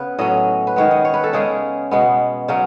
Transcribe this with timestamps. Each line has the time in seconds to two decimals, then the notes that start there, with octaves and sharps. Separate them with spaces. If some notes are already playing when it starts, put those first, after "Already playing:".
Already playing: C#3 B3 B4
0.19 A2 F#3 C#4 D#5
0.67 B4
0.76 D#3 G#3 B3 C#5
0.91 D#5
1.05 C#5
1.14 B4
1.24 A4
1.33 C#3 G#3 C#4 G#4
1.91 B2 G#3 B3
2.48 C#3 F#3 C#4